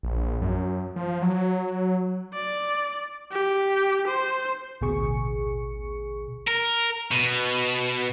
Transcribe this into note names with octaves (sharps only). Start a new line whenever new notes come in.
A#1
F#2
F3
F#3
D5
G4
C5
A1 D2 B2 G#4 C#6 C#7
A#4
B2